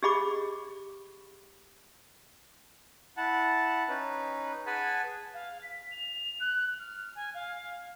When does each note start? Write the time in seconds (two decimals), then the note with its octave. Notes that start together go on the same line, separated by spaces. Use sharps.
0.03 G4 G#4 D#5 B5 D6
3.17 E4 F#5 A5
3.89 C#4 D#4 B4
4.66 G#4 B4 F#5 G#5 A5 B5
5.34 F5
5.62 B6
5.91 F7
6.40 F#6
6.79 F6
7.15 G#5
7.34 F5